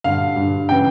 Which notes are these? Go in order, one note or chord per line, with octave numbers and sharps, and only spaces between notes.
G2 D3 F5
G2 D3
C#3 E3 G5